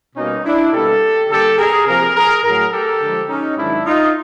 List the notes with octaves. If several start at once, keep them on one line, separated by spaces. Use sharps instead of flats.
B2 G3 A#3 C#4 D#4
D4 E4
B2 G3 A#3 G4 A4
D3 G3 A#3 G4 A4
G#4 A#4
C3 F3 A#3 G#4 A#4
G#4 A#4
A2 F#3 A3 G#4 A#4
G4 A4
D3 F3 G#3
C#4 D#4
G#2 D#3 F#3 D4 E4
D#4 F4